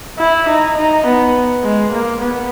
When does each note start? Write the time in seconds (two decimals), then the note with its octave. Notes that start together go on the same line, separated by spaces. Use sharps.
0.19 E4
0.49 D#4
0.77 D#4
1.06 B3
1.64 G#3
1.92 A#3
2.22 B3